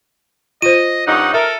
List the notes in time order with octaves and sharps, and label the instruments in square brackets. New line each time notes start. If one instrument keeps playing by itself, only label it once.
[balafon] F4 C5 [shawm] D#5 [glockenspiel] D#7
[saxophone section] G2 C#4 D#4 [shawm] F#5
[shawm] A4 [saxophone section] A#4 [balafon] E5